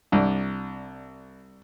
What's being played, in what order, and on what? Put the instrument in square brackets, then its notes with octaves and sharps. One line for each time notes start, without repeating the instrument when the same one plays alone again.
[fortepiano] C2 D4